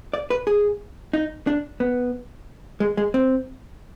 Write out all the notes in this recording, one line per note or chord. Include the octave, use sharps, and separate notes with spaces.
D5
B4
G#4
D#4
D4
B3
G#3
G#3
C4